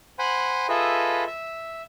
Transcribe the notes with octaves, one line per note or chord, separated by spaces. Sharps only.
C5 F#5 G#5 B5
F4 G#4 A4 B4 D#5 E5
E5